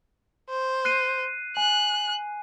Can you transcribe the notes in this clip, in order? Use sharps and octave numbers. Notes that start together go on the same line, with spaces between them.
C5
F#6 C7 D#7
G#5 F#6